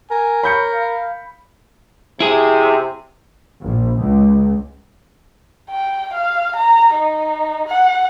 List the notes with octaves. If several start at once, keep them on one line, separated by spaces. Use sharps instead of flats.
A#4 G#5
C#5 B5 G6 C#7
F5
C3 E4 G#4
A#1
C#2
G5
F5
A#5
D#4
F#5